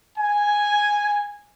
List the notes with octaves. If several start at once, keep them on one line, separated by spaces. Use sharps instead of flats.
G#5